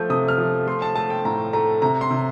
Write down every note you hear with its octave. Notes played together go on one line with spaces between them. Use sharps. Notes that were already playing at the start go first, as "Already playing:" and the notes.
Already playing: F3 A3 G6
C3 D#6
F6
F3
A3 C6
A5
A3 A5
G5
A2 A#5
A3 A#5
C3 A#5
C6
C3